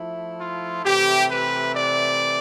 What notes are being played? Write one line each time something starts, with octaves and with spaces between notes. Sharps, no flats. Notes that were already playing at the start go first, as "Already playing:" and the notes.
Already playing: F3 A3 E4
F4
C3 E3 A3 G4
B4
D5